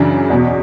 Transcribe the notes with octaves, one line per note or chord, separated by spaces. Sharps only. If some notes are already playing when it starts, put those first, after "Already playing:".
Already playing: F#2 C#3 E3 D4
E2 B2